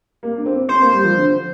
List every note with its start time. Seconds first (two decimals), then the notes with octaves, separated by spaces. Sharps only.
0.23 A#3
0.36 D4
0.46 C4
0.69 C4 C5
0.81 A#3
0.93 G3
1.04 F3
1.16 D3